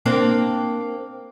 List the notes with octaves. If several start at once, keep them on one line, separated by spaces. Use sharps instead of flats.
A#3 C4 D4